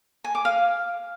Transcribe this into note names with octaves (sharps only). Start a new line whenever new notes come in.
G#5
D6
F5